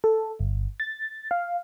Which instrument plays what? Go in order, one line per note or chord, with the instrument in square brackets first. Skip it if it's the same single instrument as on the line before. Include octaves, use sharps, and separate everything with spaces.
[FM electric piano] A4
G1
A6
F5